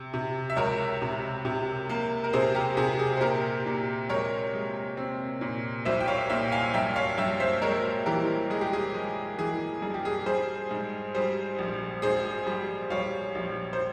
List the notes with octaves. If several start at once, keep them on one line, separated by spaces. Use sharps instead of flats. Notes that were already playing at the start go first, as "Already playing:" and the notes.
Already playing: C3
C3
E5
C#2 A#4 C#5
C3
C3
A#3
A#4
C3 G#4 C5
G4 A#4
C3 G#4
G#4
C5
A#2 G4 A#4
A#2
G#3 A#4 C#5
G#3
C4
A#2
C2 C5 E5
G5
C#5 F5
A#2 E5 G5
F5 G#5
G2 E5 G5
C#5 F5
G2 E5 G5
C5 E5
G#3 A#4 C#5
E3 G4 A#4
G#3 G#4
G4
G#4
G#3
E3 G#4
G2 G#4
G4
G#4
G3 G#4 C5
G#2
G3 G#4 C5
A#1
G#2 G#4 C5
G3
G3 C#5 F5
A#1
C5